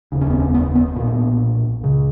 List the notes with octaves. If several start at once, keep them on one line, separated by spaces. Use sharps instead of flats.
F1 D#2 C#3
C#4
B3
C#4
B3
B3
B1 A#2 B3
C#2 C#3